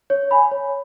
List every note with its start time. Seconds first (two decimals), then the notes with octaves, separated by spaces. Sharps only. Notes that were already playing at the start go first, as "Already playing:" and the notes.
0.10 C#5
0.31 G#5 B5
0.51 C#5